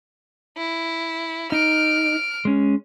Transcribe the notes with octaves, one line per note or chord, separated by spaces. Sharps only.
E4
D#4 F6 D7
G#3 C#4